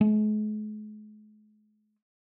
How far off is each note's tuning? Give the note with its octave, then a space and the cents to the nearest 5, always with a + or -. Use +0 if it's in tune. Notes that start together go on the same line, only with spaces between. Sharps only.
G#3 +45